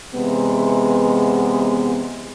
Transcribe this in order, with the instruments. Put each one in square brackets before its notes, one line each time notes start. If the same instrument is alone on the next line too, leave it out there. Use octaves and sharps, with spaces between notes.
[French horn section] E2 C3 G#3 B3